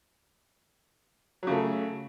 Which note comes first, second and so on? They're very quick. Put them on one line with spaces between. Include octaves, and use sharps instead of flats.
F#3 C#3 A3